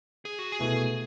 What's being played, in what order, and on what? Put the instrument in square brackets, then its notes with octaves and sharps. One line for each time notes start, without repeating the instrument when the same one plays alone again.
[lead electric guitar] G#4
F#4
G#4
[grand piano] B2 A3 E4